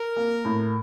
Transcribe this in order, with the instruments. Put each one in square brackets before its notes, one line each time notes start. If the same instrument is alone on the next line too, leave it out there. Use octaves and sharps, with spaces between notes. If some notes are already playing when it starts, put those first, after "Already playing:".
Already playing: [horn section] A#4
[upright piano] A#3
A2